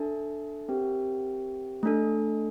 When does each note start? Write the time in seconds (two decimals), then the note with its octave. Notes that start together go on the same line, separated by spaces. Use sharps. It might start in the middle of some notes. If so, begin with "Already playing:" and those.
Already playing: D4 A4 E5 A5
0.68 C4 G4 A#4 E5 G5
1.83 A3 D4 A4